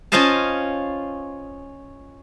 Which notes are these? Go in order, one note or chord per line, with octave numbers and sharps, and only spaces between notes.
C#4 F4 C5 D#5 F5 A5